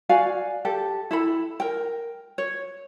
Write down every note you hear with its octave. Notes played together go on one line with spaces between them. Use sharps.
F#4 D5 F5 G#5
G4 A4
E4 A4 B5
A#4 G5
C#5